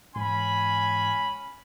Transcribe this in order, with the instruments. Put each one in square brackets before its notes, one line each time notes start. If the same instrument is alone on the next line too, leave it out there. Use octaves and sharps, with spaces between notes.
[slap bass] G#2 E3 [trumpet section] C#4 G#5 B5